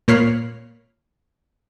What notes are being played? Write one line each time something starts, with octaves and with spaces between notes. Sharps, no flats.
A#2 A#3 C#5 B5 F6 C7